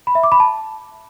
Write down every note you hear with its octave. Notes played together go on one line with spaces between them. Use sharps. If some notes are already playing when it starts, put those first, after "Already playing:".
B5
E5
D6
B5
A5